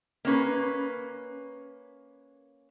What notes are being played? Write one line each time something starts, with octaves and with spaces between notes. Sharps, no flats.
A#3 C#4 B4